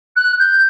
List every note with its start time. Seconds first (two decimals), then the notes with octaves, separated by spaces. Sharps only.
0.16 F#6
0.39 G6